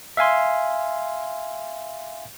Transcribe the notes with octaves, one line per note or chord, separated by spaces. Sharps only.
E5 F5 G#5 C6